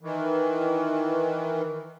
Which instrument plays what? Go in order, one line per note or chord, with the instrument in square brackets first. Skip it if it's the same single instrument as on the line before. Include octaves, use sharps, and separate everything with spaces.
[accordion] D#3 E3